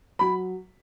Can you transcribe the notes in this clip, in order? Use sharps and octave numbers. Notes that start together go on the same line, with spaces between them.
F#3 B5